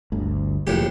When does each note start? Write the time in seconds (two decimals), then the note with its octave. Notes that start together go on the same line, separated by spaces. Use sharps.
0.12 G1 D2
0.67 F1 A#1 E2 A2 G4